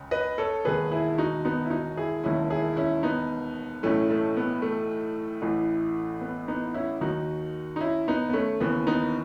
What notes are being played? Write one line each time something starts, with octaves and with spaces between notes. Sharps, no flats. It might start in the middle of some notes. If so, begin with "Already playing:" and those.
Already playing: C#2 C#3
B4 D#5
A4 C#5
E1 D#2 D#3 G#4 B4
E4 G#4
D#4 F#4
B3 D#4
E4
D#4 F#4
E4 G#4
E1 D#2 D#3 C#4 E4
E4 G#4
C#4 E4
B3 D#4
B1 A2 E3 A3 C#4
A3 C#4
B3
A3
A1 A2 E3
B3
B3 D#4
C#4 E4
D#2 D#3 D#4 F#4
D#4
C#4 E4
B3 D#4
B3
A3 C#4
D#2 C#3 E3 B3
B3 D#4